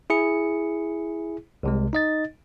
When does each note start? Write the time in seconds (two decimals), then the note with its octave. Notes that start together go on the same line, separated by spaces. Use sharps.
0.10 E4 G#4 C#7
1.63 C2 C3 G#3
1.93 D#4 D#5 A6